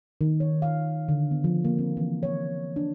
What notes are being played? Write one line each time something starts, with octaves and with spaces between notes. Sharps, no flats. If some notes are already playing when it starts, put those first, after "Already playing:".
D#3
C#5
F5
D3
B3
F3
A#3
C4
E3
C#5
D4